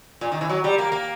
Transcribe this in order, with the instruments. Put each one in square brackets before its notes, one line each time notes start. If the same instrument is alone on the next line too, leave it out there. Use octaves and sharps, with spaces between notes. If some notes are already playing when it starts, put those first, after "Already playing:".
[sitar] A#2
D#3
E3
F#3
G3
A#3
A#3